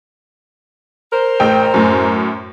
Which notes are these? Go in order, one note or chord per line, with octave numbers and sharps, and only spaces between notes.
A#4 C5
A1 G5
F#2 A2